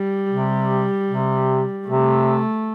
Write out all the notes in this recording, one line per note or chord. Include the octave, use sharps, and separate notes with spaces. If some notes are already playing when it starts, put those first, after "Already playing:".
Already playing: G3
C3
C3
C3 A3